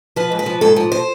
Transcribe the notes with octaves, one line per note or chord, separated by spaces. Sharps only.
F3 B4
G#2
B4
F3
G#2 A4
F3
C5